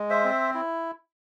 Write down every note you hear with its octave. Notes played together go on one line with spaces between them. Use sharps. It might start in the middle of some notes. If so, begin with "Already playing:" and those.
Already playing: G#3
C5 E5
C4
E4